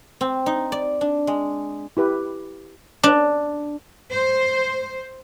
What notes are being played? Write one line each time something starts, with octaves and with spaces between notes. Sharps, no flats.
C4
D#4
D5
D4
G#3
E4 G4 B4
D4
C5